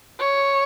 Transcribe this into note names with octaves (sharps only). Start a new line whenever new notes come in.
C#5